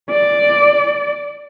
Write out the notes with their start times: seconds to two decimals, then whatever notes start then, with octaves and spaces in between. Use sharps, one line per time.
0.11 D5